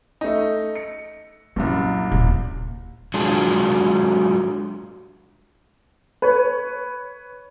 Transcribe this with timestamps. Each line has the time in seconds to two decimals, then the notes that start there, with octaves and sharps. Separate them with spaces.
0.21 A3 D#4
0.76 C#7
1.56 C2 F#2 A#2 F#3
2.11 D#1
3.14 F#3 G#3 D4 F4 G#4
6.22 B4 C#5